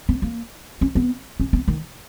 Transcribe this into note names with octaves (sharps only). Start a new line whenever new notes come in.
B3
A#3
C#4
B3
C#4
B3
D#3